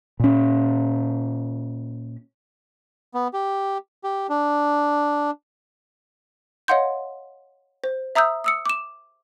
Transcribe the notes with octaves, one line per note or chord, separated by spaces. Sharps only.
A#2 C#4
B3
G4
G4
D4
C#5 D#5 F5 F#5 C6 G6
C5
E5 A#5 D#6 E6 G6
D#6 E6 C#7
D6 E7